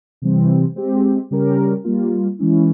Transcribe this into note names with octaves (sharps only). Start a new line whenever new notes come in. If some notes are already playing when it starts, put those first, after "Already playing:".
C3 E3 G3 C4
G#3 C4 G4
C#3 G3 C#4 G4 A#4
G3 A#3 F4
E3 G#3 C#4 E4